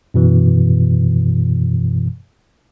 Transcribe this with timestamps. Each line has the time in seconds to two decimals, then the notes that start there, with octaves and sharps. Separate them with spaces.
0.14 F#2 B2 E3